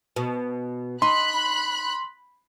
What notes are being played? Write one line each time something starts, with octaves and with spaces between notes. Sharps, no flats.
B2
D#4 B5 C6 F#6